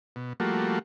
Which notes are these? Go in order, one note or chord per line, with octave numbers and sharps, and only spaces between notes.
B2
F3 G3 A3 A#3 F#4